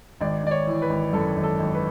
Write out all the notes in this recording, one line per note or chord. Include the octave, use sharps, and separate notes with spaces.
G#1 D5
G#1 D5
C#5
E3
B4
G#1
F#2 A4
G#1
A4
G#1
B4